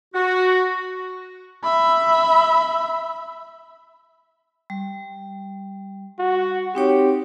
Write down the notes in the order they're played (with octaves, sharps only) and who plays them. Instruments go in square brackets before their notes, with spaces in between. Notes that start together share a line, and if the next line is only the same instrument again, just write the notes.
[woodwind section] F#4
[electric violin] E5 B5
[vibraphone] G3
[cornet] F#4
[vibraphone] C4 D#4 C#5 [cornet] G4